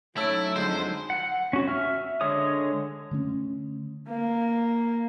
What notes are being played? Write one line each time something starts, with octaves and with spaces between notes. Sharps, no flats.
F#3 A3 C#4 D#4 E4 A5 E6 D7
F2 D3 G#3 C5
F#5
C#4 F#4
E5 F6
D3 G#3 C#5 D#6
D3 A3 B3 C#4
A#3